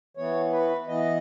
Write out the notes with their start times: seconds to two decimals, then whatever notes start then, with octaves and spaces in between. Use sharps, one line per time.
0.17 E3 B3 C#5
0.52 B4
0.87 E3 B3 D#5